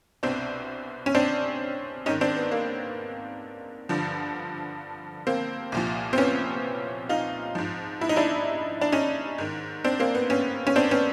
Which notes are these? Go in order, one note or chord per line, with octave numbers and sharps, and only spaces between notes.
C2 B2 C4 D4
C#4
C4 D4
G#2 D#3 C#4 D#4
C4 D4
B3
A#3
G2 D3 F3
A#3 C4
C2 A#2 F3
C4
B3 C#4
D#4 F4
G#2 F3
E4
D#4
D4 E4
D4
C#4 D#4
G#2 D#3
C4 D4
A#3 C4
B3
B3 C#4
C#4
C4 D4
B3 C#4